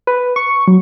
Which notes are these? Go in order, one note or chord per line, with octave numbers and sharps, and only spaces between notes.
B4
C#6
F#3